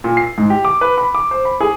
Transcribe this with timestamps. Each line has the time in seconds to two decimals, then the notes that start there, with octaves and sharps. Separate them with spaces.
0.04 A#2
0.17 C7
0.38 G#2
0.50 G4
0.65 D6
0.81 B4
0.98 B5
1.15 D6
1.31 C5
1.45 B5
1.61 G#4